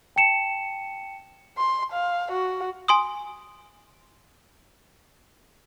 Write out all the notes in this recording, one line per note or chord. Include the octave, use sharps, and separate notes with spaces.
G5 A5 C#7 E7
C6
F5
F#4
G#5 C6 D#6